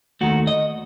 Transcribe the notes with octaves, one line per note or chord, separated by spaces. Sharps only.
D#2 D#3 A3 F#4
D#5